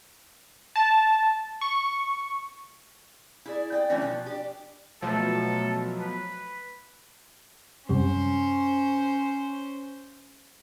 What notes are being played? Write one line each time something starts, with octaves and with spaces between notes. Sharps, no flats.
A5
C#6
E4 G#4 D5
D5 G5
D3 E3 G3 A3 C#4 D4
B2 F3
D4 G4
B2 F3 F#3 A3 A4
B4
F#2 C3 G3 C#4 C5